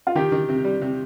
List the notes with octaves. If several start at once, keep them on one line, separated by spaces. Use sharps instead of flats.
F4
D#3 G4
D#3
C3
G3
C3